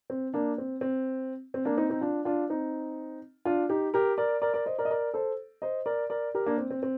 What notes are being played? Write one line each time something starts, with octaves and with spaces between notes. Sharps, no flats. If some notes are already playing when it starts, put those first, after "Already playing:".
C4
A#3 D4
C4
C4
C4
A#3 D4
C4 D#4
C4 D#4
D4 F4
D4 F4
C4 D#4
D4 F4
D#4 G4
G4 A#4
A#4 D5
A#4 D5
A#4 D5
C5 D#5
A#4 D5
D#5
A#4 D5
A4 C5
C5 D#5
A#4 D5
A#4 D5
G4 A#4
A#3 D4
C4
C4
C4